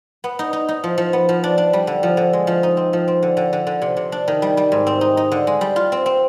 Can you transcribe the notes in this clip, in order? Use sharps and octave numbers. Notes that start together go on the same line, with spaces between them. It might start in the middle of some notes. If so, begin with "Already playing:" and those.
B3
D#4
D#4
D#4
F3
F3
B3
F3
D4
D4
G3
D3
F3
D3
G#3
F3
D#4
C4
F3
C4
D3
D3
D3
D3
C3
C3
D4
D#3
G3
G3
G#2
C4
D#4
D#4
D3
G#3
G3
F4
C4
C4